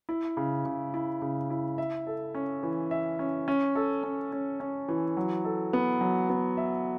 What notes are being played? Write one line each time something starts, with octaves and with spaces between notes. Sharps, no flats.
E4
C#3
C#3
E4
C#3
E4
E5
A4
C#4
E3
E5
C#4
C#4
A4
C#4
C#4
C#4
E3
F#3
A4
B3
F#3
B3
E5